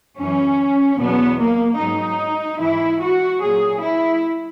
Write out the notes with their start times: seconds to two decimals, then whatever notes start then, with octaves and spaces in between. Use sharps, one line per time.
0.17 F#2 E3 C#4
0.99 E2 B2 F#3 B3
1.39 A#3
1.79 G#2 F#3 D#4
2.60 G#2 E3 E4
3.01 F#4
3.41 A#2 F#3 G#4
3.82 E4